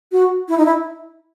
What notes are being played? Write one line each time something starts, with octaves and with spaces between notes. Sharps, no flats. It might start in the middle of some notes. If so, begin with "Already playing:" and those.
F#4
E4
D#4
E4